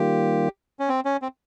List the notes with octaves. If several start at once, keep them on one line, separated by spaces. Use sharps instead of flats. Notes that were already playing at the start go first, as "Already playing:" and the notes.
Already playing: D#3 G3 A#3 F4 G4
C#4
C4
C#4
C4